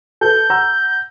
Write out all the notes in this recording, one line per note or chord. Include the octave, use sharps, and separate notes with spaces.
A4 B4 G6
F#5 A#5 E6